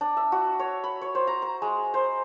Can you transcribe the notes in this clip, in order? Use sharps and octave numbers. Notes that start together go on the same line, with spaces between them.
D4
E5
F#4
C#5
B5
C#5
C5
A#5
A#5
G#3
C5